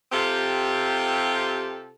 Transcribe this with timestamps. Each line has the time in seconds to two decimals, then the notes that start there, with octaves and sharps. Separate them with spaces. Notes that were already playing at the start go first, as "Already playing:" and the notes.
0.12 C3 C4 F4 G4 A4